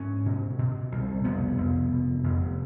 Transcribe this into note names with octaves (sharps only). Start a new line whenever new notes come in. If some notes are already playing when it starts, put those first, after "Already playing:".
Already playing: G#2 C#4
B2
B2
C2
F1 B3
F1
B2
F1